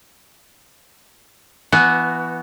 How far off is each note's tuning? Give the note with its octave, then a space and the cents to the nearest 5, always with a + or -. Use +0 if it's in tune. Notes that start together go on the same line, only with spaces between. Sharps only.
E3 +25 B3 +0 F#4 +0